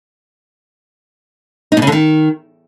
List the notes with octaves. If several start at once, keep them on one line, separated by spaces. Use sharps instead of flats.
D#4
B2
C#3
D3
D#3